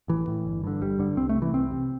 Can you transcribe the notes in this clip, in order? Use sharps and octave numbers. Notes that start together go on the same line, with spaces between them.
A1 E3
A2
G1
G2 D3
G1 G3
G2 D3
C2 C4
A3
C3
E3
C2 C4
C3